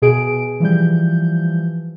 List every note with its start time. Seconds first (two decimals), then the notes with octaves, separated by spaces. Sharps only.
0.02 B2 G#4 D7
0.60 E3 F3 G3 G6